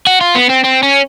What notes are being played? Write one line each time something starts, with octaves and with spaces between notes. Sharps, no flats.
F#4
F4
B3
C4
C4
C#4